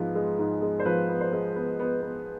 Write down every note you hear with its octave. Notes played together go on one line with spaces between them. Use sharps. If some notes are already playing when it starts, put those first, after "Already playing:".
Already playing: G#2 F3 B3
G#3
G#2
G#3
C5
F3 B4
B3
C5
G#3
B3
B3
B3